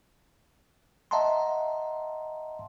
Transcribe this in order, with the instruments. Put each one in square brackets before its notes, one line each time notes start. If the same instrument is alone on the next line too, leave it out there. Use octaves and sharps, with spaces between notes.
[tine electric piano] D#5 E5 F#5 A5 A#5 C6